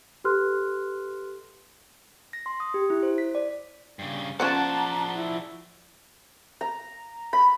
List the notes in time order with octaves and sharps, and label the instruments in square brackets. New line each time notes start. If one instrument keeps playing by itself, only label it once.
[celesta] G4 A4 B4 C6 F6 F#6
[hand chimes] A#6
C6
D#6
G4
E4
C5
B6
D5
[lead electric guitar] G2 C#3
[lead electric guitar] F3 D5 [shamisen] C#4 F4 C5 [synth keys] F#5 A5 [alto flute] A#5
[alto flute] E4
[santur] A#5
B5